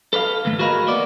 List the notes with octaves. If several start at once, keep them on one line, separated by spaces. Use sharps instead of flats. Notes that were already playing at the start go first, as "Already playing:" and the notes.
A4 B4 C#5 F5
D#2 G#2 A3
F#4 G#4 A#4 B4 D#5 F5
A#3 B3 D5